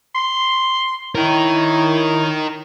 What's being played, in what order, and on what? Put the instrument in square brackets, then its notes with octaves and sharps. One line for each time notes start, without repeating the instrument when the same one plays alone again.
[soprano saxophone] C6
[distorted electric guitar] D#4 A#4 [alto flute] E4 [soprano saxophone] C#5